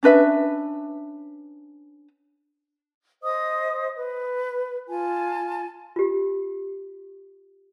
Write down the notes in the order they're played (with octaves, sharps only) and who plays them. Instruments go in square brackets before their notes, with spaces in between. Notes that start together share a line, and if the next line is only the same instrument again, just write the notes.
[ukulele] C#4 D4 B4 E5
[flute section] C5 D#5 D#6
B4
F4 G#5 A5
[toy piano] F4 G4